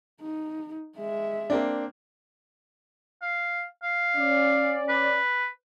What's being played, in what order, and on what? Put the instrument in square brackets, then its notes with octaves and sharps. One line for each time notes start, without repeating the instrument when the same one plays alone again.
[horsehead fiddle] D#4
G#3 E5
[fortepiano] A#3 C4 D4
[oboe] F5
F5
[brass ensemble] C#4 D5
[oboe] B4